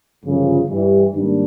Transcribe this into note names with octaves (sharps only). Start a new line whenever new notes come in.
G1 F#2 C#3 F3
G2 E3 G3
G#2 D#3 G3 A#3 D4